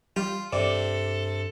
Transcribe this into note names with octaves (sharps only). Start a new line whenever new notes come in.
G3 F4
G2 C3 A4 D5